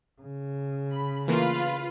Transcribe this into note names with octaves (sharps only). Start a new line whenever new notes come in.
C#3
B5
E3 A3 A#3 F4 B4 F5